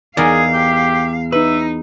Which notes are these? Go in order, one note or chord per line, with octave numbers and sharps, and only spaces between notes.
E2 D#4 G#4 A#4 D5 F5
G4
D#4 B4 E5